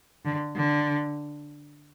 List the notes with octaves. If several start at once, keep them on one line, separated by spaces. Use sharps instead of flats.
D3
D3